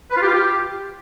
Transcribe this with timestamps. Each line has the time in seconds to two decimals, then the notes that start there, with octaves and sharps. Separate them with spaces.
0.11 B4
0.17 F4
0.22 G4
0.28 F4
0.34 G4